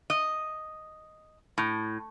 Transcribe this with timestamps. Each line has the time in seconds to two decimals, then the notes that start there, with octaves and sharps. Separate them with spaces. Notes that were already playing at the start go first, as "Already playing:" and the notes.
0.10 D#5
1.58 A2